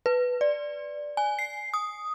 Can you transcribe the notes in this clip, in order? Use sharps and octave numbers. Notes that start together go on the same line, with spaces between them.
B4
D5
G#5
C7
D#6